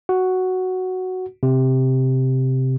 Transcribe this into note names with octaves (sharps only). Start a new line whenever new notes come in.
F#4
C3